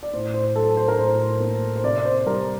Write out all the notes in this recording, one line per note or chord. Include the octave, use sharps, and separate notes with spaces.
D5
A2 C5
C5
F#3 A4
C5
A#4
A2 C5
A#3
C5
C3 D5
D5
C5
G3 A#4